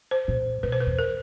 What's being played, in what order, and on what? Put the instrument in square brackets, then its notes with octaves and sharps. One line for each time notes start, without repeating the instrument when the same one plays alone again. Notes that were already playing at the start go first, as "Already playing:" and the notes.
[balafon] C5
[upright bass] A#2
[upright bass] B2 [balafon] B4
[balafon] C5
B4
[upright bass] E2
[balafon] A#4